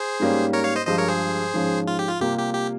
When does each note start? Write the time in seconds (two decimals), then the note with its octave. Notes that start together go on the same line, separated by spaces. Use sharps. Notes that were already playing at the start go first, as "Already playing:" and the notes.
Already playing: G#4 C5
0.20 G#2 G3 A#3 C#4 G4
0.53 A#4 C#5
0.64 C#5 F5
0.76 C5 D#5
0.86 G2 F3 G#3 C5 D#5
0.98 A#4 C#5
1.09 G#4 C5
1.54 G#2 F3 G#3 C#4
1.88 F4
1.99 G4
2.09 F4
2.20 C3 G3 A#3 F4 G4
2.38 G4
2.54 G4